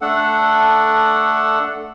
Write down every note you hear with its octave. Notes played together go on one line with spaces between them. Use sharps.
A3 D4 A4 F#5